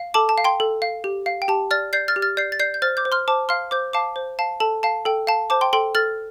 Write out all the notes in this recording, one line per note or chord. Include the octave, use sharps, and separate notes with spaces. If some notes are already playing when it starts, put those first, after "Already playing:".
Already playing: F5
A4 A5 D6
A5
F5
G5 C6
A4
F5
G4
F5
G5
G4 A5
D5 F6 A6
D5 G6 C7
F6 A6
G4
F6 A6
D5 G6 C7
A6
D5 G6 C7
G6
C5 F6 A6
D6 G6
C5
C6 F6
C5 A5 D6
F5 C6 F6
C5 D6 G6
F5 A5 D6
C5
F5 A5
A4 A5
F5 A5
A4 G5
F5 A5
C5 A5 D6
G5 C6
A4 G5 C6
A4 F6 A6